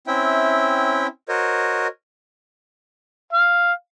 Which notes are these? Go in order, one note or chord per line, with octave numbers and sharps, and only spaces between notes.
C4 C#4 E4 E5 G5
F#4 A#4 C5 C#5 D#5
F5